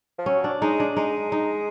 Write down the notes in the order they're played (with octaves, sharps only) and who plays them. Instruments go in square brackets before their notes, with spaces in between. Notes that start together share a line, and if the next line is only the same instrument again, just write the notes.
[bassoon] F3
[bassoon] F#3 [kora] C#4
[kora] D4
[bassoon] G#3 [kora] D#4
[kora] D4
[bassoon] G#3 [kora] D#4
[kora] D#4